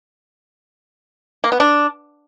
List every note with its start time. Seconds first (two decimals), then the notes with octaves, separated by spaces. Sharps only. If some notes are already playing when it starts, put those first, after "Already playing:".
1.44 A#3
1.52 B3
1.60 D4